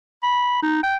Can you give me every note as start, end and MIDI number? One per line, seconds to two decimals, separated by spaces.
0.23 0.61 83
0.62 0.82 63
0.83 0.96 79